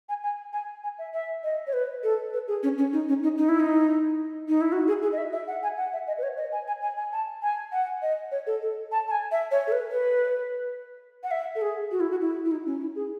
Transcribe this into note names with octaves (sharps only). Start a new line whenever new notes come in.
G#5
G#5
G#5
G#5
E5
E5
D#5
C#5
B4
A4
B4
G#4
C#4
C#4
D#4
C#4
D#4
D#4
E4
D#4
D#4
E4
F#4
G#4
G#4
D#5
E5
E5
F#5
G#5
F#5
E5
D#5
B4
C#5
D#5
G#5
G#5
G#5
G#5
A5
G#5
F#5
D#5
C#5
A4
A4
A5
A5
G#5
E5
C#5
A4
B4
B4
F#5
E5
A4
G#4
F#4
E4
F#4
E4
E4
D#4
C#4
E4
G#4